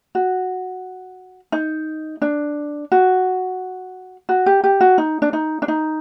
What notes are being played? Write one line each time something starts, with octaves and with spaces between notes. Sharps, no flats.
F#4
D#4
D4
F#4
F#4
G4
G4
F#4
D#4
D4
D#4
D4
D#4